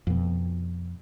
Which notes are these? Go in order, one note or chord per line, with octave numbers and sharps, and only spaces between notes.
F2 B2